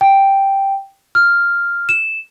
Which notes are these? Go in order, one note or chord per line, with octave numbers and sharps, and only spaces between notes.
G5
F6
E7